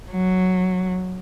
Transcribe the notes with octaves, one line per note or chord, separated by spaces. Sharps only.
F#3